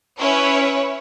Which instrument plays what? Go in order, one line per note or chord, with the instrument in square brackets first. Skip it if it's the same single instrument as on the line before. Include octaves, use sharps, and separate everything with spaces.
[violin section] C#4 E4 B4 C#5